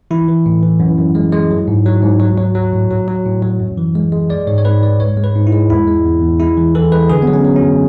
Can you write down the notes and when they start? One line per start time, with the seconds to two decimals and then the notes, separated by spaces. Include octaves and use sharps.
0.11 E3 E4
0.28 E3
0.46 A2
0.63 E3
0.80 F#2
0.98 F#2
1.15 G#3
1.32 G#3
1.51 F#3
1.68 G#2
1.86 F#3
2.03 G#2
2.20 F#3
2.38 F#3
2.55 F#3
2.73 A2
2.91 F#3
3.08 F#3
3.26 A2
3.43 F#3
3.60 F#2
3.78 E3
3.95 G#3
4.12 G#3
4.30 G#3 D5
4.47 G#2 C#5
4.58 C#5
4.65 G#2 B4
4.83 G#2 D5
5.00 G#2 C#5
5.17 G#3
5.24 B4
5.35 G#2
5.47 E4
5.53 G#3
5.70 E2 E4
5.87 G#3
6.06 E2
6.22 E2
6.40 G#3 E4
6.57 E3
6.75 E3 A4
6.92 G#3 B4
7.10 D3 G#4
7.22 F#3 B3
7.34 C#4
7.45 F#3
7.56 C#4
7.62 F#2